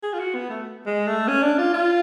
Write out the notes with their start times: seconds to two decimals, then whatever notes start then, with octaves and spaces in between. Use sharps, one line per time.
0.03 G#4
0.13 F4
0.19 F#4
0.34 B3
0.50 A3
0.86 G#3
1.07 A3
1.27 C#4
1.43 D4
1.58 F4
1.74 F4